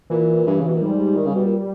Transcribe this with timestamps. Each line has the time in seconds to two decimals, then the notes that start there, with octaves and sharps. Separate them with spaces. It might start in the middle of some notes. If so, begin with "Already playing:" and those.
0.10 A#2 E3
0.47 G2 E3
0.60 C#3
0.68 B2
0.76 A#2
0.82 G#2 G3
1.16 D#3
1.26 C#3
1.35 B2
1.44 A#2